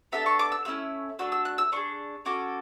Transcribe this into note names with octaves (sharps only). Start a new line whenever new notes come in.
B3 D4 A4 E5
C#6
D6
E6
A3 C#4 E4 E6
A3 D4 F#4 A4 E6
E6
F#6
E6
D4 G#4 C#6
C#4 F#4 A4 D6